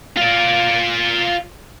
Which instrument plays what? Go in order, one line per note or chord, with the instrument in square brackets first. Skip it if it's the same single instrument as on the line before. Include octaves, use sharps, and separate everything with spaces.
[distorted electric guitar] F4 D5